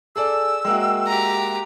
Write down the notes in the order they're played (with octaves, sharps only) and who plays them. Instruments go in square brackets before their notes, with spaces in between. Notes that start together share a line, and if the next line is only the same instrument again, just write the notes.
[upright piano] G#4 A4 D5 [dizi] E6
[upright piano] G#3 A#3 F#4 [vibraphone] E5 G5
[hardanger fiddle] G4 A#5